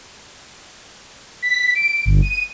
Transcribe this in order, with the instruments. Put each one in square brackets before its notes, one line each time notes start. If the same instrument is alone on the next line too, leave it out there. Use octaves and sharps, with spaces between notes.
[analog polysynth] B6
D7
G1
D#7